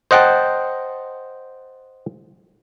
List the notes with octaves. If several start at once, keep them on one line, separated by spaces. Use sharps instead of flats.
C5 D#5 F#5 G5 A5